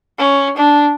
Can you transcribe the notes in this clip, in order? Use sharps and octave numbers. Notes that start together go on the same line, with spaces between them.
C#4
D4